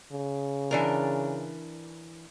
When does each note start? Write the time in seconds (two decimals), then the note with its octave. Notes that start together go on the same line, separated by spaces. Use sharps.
0.12 C#3
0.71 E3 D4 A#4